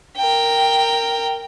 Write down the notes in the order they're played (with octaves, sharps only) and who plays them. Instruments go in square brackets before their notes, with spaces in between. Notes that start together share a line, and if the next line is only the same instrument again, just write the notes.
[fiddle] A#4 G5